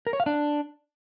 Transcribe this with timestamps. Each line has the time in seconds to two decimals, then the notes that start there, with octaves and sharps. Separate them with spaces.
0.07 A#4
0.13 C#5
0.20 F5
0.26 D4